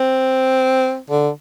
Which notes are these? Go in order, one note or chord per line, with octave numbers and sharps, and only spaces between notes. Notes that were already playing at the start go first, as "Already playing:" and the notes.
Already playing: C4
D3